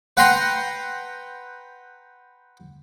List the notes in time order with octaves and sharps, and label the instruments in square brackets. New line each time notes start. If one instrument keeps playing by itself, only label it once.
[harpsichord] B4 F#5 G5 A#5 C6